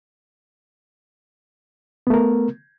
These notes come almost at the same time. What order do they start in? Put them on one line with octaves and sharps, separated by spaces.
B3 A3 A#4